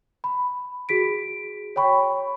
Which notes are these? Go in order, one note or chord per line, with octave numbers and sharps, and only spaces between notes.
B5
F#4 G#4 B6 D7
C#5 G5 B5 C#6